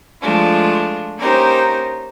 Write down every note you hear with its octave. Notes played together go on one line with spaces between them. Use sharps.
F3 G#3 A3 D4 F4
A#3 C#4 D#4 G4 A#4 C5